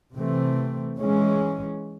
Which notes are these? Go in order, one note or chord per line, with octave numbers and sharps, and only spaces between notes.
C3 E3 A3 C4
E3 G#3 C#4